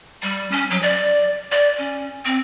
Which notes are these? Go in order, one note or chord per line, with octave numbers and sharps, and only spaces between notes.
G3
C#4
F#3
D5
D5
C#4
C4